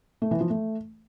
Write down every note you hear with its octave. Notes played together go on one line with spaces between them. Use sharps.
A3
E3
F3
A3